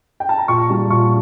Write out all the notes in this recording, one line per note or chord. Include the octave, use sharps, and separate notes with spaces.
G5
A5
A#5
A#2 C#6
G3 A5
A#2 C#6